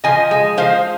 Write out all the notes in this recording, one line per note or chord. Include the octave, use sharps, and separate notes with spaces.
F3 D#5 G#5
G#3
F3 C5 F5